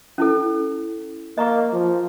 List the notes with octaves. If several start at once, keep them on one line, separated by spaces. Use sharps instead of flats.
C#4 E4 A4
A#3 D#5 A#5 C#6
F3